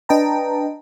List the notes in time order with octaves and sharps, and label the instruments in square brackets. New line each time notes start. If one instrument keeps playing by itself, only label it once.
[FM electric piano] D4 B4 D#5 G5 A5 A#5